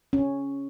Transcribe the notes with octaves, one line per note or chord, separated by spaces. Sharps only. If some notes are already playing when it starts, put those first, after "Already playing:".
C#4